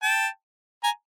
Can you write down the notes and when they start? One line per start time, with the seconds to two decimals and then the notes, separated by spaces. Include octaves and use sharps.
0.03 G5 A5
0.84 G#5 A#5